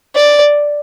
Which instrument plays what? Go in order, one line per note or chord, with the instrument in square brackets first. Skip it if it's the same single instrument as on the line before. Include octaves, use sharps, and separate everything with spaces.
[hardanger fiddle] D5